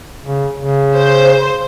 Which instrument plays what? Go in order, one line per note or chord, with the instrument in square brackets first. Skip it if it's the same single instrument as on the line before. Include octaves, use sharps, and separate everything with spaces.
[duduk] C#3
C#3
[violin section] C5